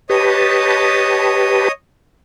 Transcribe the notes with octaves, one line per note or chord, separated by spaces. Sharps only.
G4 B4 C#5 D#5 A5 D#6